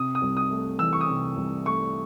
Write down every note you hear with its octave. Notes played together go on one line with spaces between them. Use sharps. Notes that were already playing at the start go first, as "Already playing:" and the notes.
Already playing: C3 D#6
D#6
C2
D#6
A3
E3 E6
C#6
D#6
C3
C2
A3 C#6